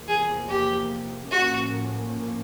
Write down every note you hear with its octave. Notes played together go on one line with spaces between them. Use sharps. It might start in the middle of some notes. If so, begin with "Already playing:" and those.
Already playing: E2 C3 F3 A#3
G#4
G4
A2 F3 A#3 C#4 F#4